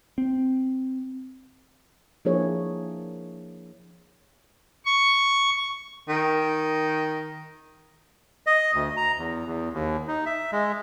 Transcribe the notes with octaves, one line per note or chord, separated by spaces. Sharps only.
C4
F3 A#3 D4 E4 G#4 C#5
C#6
D#3
D#5
D2
A#5
E2
E2
D#2
D#4
E5
G#3